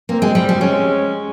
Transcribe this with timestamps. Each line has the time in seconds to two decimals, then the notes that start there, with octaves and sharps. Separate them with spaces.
0.09 A#3 C4
0.22 G#3
0.35 G3
0.49 G3
0.61 G#3 C#4